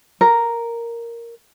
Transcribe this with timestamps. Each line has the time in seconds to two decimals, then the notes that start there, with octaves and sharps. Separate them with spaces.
0.21 A#4